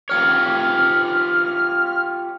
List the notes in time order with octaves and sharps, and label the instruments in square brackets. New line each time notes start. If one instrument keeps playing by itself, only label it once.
[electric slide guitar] F4 G4 C#5 [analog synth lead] F6